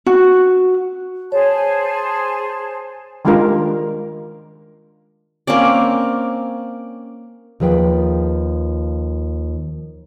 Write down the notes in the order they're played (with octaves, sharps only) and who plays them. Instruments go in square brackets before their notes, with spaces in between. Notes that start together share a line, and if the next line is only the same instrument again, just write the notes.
[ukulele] F#4
[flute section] G#4 C5 A5 [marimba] C#5
[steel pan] D#3 G3 G#3 D4 F4 A#4
[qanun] A#3 C4 C#4 D5
[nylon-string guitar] D#2 F3 G#4 B4 G5